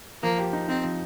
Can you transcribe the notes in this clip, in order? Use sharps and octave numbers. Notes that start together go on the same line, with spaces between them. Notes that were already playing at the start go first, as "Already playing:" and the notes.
F3 A#3
G4
D#4
C4 D#4
F3